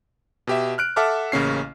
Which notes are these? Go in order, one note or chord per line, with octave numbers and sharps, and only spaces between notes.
B2 G4 E5
F6 F#6 D7
A4 E5 F#5 A5 D6 F6
A1 C#3 A#3 C#4 C7